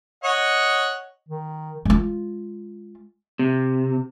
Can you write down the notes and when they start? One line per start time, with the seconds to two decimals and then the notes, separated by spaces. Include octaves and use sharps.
0.24 C#5 D#5 F#5
1.29 D#3
1.85 G#3 F4
3.39 C3